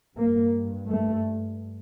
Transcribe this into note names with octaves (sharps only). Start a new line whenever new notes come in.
G2 A#3
A3